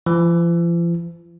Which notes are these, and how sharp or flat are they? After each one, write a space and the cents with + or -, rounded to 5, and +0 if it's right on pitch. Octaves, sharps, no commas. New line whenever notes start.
F3 -45